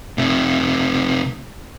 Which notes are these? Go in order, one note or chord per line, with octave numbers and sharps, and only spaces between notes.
C3 A3